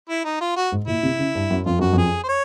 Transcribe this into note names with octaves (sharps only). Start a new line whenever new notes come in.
E4
D#4
F4
F#4
G#2
A#2 E4
C3
C#3
G2
F#2
F2 F4
F#2 F#4
F2 G#4
C5
C#5